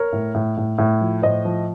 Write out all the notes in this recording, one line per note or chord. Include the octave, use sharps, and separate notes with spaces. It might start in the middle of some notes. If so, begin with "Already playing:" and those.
Already playing: A#4 C#5
A2
A2
A2
A2
F3
A2 C5 D#5
F3